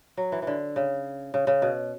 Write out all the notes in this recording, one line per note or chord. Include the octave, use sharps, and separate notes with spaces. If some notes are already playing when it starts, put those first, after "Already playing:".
F#3
E3
D3 E3
C#3
C#3
C#3
B2